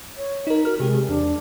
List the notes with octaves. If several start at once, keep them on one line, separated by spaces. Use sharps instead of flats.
C#5
D#4 A#4
F#4 A#4 F6
C3 G#3 G4
E2 D4